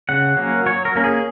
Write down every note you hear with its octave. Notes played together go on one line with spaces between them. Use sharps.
C#3 F#5
F#3 A#3 C#4
F#3 C#5
A#4
A#3 C#4 A#4
G#4